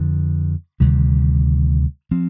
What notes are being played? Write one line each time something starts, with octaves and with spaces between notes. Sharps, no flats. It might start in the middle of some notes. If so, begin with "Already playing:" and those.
Already playing: F2 D3 F3
D2 C3 D#3 G3
F3 C4